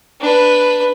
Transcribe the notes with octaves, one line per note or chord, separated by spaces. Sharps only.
D4 B4